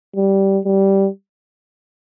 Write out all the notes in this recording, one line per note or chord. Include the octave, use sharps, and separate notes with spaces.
G3
G3